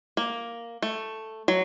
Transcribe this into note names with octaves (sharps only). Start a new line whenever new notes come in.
A#3
A3
F#3